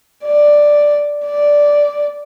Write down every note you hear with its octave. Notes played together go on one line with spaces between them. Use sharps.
D5
D5